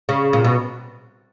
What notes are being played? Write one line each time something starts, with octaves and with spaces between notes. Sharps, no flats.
C#3
A#2
B2